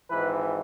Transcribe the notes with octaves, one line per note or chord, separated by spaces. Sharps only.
G#1 G#2 E3 B4